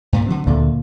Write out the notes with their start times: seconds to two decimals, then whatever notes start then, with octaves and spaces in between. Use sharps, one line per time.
0.13 G2 A#2 A3
0.26 D3 F#3 C4
0.47 D2 A#2 D3